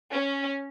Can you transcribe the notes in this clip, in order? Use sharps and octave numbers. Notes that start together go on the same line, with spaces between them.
C#4